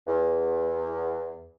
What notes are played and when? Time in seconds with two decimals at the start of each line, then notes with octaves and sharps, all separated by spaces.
0.07 E2